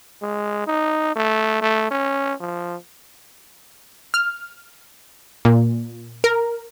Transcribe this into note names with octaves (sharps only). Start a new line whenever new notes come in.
G#3
D#4
A3
A3
C#4
F3
F6
A#2
A#4